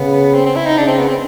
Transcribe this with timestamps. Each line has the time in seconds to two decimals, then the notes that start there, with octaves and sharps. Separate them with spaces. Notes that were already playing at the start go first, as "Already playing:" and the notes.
Already playing: C#3 B3
0.35 C4
0.46 C4
0.56 E4
0.66 D#4
0.78 C#3 D4
0.88 C4
0.99 B3
1.09 C4